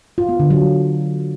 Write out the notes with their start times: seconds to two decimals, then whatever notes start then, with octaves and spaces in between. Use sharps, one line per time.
0.18 F4
0.29 B3
0.40 D3
0.50 F#3